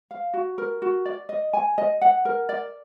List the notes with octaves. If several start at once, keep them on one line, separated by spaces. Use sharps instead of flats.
F5
F#4
A#4
F#4
D5
D#5
G#5
D#5
F#5
A#4
D5